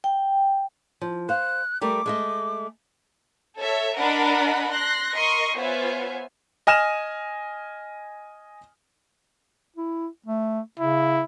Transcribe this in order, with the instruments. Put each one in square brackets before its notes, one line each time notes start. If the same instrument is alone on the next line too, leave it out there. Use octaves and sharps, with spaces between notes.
[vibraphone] G5
[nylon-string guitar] F3
[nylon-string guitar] C5 F5 [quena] F#6
[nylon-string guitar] G3 A3 A#4 [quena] D6
[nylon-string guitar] G#3 A3 D#5
[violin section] A4 C#5 E5
D4 A#4 D#5 F#5 B5
C6 F#6 A#6
A#4 D#5 C6 C#6
B3 F4 C5 C#5 E5 G#5
[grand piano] D#5 G#5 F6 E7
[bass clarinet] E4
A3
[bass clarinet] C#3 [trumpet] E4